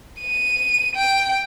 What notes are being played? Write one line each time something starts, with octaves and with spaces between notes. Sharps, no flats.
D#7
G5